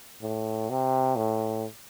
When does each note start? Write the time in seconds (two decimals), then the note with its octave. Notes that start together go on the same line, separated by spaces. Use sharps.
0.22 A2
0.70 C3
1.16 A2